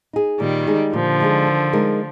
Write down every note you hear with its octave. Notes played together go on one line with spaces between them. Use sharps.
D#4 G#4
A#2 D#3 G3
G#3 D#4 G#4
A#2 D3 F3
G#3 D#4 G#4
D#3
G#3 D#4 A#4